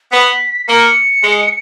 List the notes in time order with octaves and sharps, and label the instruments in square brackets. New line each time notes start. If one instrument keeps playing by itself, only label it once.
[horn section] B3 [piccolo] B6
[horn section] A#3 [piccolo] C#7
[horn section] G#3